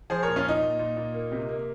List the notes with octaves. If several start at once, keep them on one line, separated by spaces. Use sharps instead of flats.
F3 G#4 C5
A#2 A#4 C#5
C#4 F4
A#2 D#4
A#2
A#2
A#2
A#3
C3
A#3